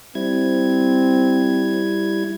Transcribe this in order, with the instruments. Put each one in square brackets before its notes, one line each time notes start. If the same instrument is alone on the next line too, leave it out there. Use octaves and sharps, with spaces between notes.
[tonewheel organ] G3 E4 G#6 [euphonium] C4